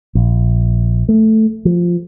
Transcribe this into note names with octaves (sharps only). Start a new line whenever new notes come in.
A#1
A3
F3